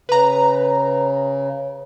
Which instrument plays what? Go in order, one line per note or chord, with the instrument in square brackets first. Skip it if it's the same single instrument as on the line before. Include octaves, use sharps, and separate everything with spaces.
[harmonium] C#3 [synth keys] B4 A#5